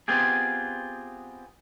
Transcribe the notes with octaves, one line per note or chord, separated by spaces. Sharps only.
B3 C4 F4 G4 G#4